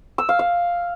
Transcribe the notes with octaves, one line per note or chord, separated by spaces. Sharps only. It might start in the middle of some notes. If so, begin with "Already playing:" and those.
E6
F5
F5